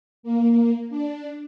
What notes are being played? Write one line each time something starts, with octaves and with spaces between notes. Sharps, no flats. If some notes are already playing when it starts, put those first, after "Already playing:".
A#3
D4